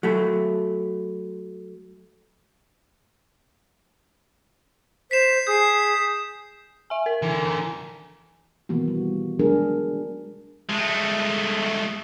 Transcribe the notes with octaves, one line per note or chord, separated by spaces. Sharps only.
F#3 A3
C5 B6 C7 E7
G#4 D#6 G6 C7
E5 G#5
A#4
D3 E3
A#5
B2 D#3 E3 A#3 B3 F#4
G3
F#3 G#3 D4 G#4 A#4
G#3 A3